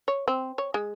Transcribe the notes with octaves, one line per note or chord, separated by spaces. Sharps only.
C#5
C4
C#5
G#3